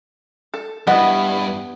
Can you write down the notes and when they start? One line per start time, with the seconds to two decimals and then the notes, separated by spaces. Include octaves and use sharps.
0.54 A4
0.87 G2 B3 E4 D#5